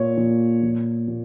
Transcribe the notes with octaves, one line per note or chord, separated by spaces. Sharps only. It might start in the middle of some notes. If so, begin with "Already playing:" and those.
Already playing: A#2 C#5
A#2
A#2
A#2